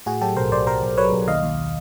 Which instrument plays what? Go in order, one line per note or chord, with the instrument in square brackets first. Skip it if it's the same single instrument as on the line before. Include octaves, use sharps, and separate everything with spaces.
[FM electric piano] A2 F#4 G#4
F#3 G4 A4
B1 A#4 C5
B1 C5 D5
B1 A#4 C5
B1
F#3 B4 C#5
B1
D#2 D#5 F5
D#2